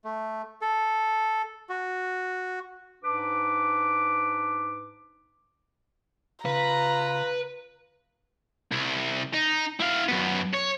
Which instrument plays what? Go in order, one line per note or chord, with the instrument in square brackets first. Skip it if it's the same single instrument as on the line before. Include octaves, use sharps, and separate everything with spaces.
[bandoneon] A3
A4
F#4
[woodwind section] G#2 D4 B4 D6
[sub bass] C#3 [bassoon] F4 [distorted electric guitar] B4 [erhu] A#5
[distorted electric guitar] C2
D#4
E4 F5
F#2 B3
C#5